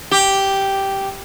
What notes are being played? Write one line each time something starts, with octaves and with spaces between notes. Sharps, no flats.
G4